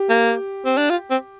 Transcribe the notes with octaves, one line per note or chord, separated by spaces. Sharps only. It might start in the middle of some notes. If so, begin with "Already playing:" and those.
Already playing: G4
A#3
C4
D4
F4
C4